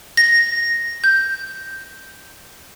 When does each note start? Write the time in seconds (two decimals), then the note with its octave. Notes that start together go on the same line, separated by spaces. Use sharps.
0.17 A#6
1.04 G6